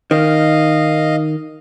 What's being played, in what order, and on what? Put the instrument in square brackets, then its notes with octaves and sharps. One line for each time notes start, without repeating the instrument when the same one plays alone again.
[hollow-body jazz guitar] D#3 [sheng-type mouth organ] D#5 F5